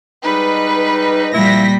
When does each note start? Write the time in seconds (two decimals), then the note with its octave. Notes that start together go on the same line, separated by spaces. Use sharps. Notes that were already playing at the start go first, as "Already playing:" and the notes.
0.25 G3 G#3 D#4 B4
1.34 A#2 F3 G3 E4 A#6 B6